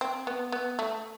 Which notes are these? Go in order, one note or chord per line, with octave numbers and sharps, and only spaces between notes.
C4
B3
B3
A3